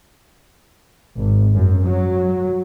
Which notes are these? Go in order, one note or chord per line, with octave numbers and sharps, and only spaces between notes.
G#1
F#2
F#3